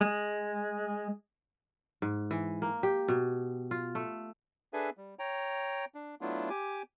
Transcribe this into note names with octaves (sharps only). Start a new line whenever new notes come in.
G#3
G#2
E3
A#3
G4
B2
F4
A3
D4 G#4 A4 B4 E5 G#5
G3
C#5 G5 A#5
D4
F#3 A3 B3 D4 E4 F4
G4 G#5 D6